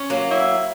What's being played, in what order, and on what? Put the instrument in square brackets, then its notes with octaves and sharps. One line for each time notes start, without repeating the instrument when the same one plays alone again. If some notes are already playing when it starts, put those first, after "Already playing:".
Already playing: [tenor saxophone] C#4
[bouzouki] F#3 A#3
[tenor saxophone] E4